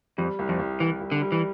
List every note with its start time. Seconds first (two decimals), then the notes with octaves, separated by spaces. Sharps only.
0.18 F2 G3
0.39 C2
0.49 F2
0.59 C2
0.80 C2 E3
1.01 C2
1.11 D3
1.21 G3
1.32 E3